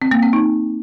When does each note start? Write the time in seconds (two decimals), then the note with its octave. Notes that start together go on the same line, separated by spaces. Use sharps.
0.02 C4
0.11 A#3
0.23 C4
0.33 D#4